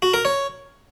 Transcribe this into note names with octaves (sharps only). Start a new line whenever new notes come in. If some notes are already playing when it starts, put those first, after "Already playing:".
F#4
A#4
C#5